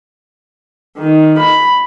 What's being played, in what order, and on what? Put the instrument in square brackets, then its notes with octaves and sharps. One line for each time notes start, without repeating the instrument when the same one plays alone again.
[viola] D#3
B5